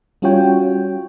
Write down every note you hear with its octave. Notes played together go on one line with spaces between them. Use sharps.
G3 C#4 F4 F#4 C#5 G5